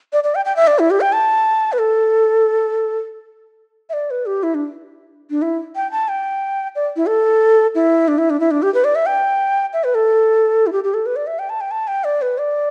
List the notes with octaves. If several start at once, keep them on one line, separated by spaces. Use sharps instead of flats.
D5
D5
G5
G5
E5
D5
E4
G4
G5
A5
B4
A4
E5
D5
B4
G4
E4
D4
D4
E4
G5
A5
G5
D5
E4
A4
E4
D4
E4
D4
E4
D4
G4
B4
D5
E5
G5
E5
B4
A4
E4
G4
G4
A4
B4
D5
E5
G5
A5
G5
A5
G5
D5
B4
D5